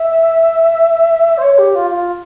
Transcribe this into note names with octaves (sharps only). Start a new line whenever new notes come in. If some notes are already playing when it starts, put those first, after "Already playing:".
Already playing: E5
C5
C#5
G4
F4
F4